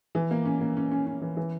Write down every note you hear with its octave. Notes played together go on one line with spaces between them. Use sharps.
E3
A#3
C#4
A#3
C#4
C#4
C#4
E3
E3